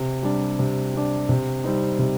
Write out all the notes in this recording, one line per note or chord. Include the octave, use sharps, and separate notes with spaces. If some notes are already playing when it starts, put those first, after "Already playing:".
Already playing: C3
G3 D4
C3
G3 D4
C3
G3 C4 D#4
C3